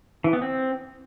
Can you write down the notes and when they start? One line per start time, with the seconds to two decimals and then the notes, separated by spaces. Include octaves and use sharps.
0.24 E3
0.33 B3
0.42 C4